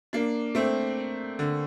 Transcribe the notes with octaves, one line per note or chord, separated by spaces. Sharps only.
A#3 D4
A3 C4
D3